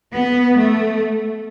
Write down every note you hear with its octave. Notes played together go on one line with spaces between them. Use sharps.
B3
A3